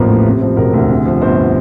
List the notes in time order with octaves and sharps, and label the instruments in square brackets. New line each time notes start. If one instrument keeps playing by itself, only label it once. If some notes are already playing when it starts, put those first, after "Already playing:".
Already playing: [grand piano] A1 E2 F3 A#3 A#4
A2
C3
F3
E1 A#4
D2
C3
F3
G1 C5